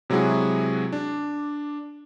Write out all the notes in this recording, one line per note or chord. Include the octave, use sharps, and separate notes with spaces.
C3 F#3 G#3 E4 F#4 G#4
D4